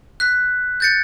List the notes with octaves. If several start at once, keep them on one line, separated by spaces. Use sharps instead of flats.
F#6 B6
G6 A6 C#7